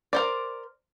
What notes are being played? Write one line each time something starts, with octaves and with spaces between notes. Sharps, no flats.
A#4 C5 D5